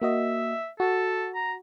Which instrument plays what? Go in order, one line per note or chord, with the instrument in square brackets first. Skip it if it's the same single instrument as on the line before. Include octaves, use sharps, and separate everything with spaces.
[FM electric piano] A#3 F#4 D#5 [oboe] E5
[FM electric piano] F#4 [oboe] A4
[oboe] A#5